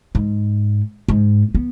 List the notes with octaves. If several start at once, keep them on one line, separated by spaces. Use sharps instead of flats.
G#2
G#2
B3